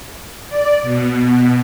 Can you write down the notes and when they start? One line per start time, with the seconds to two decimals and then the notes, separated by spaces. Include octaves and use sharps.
0.49 D5
0.82 B2